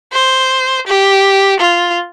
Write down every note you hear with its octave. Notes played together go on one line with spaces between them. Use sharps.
C5
G4
F4